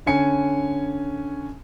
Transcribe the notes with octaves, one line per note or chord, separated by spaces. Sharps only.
D3 C#4 G#5 C#7